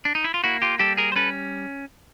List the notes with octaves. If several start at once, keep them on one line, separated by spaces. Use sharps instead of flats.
D4
D#4
E4
F4
A#3 E4 F#4
F4 G4
G3 G4 A4
G#4 A#4
C5
C#4 A4 B4